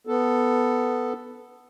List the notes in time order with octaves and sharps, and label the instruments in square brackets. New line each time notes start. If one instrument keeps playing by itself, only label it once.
[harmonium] B3 A4